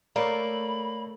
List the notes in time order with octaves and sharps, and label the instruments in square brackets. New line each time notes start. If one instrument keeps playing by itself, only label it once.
[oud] A3 [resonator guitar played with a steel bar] A#3 [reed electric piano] C#5 D5 [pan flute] B5